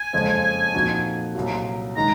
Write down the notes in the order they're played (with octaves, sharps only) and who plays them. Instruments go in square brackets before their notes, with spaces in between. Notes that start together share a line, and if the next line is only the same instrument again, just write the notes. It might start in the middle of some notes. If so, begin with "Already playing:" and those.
Already playing: [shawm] G#5
[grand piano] F#1 F2 C#3 G#3 C4
A#2 F3 C4 D#4 F#4
C2 A#2 F#3
[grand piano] D#3 G#3 D#4 [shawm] A#5